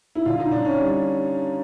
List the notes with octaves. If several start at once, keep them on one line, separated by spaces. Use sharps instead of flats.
E4
D3 F4
D#4
D3 D4
C#4
G3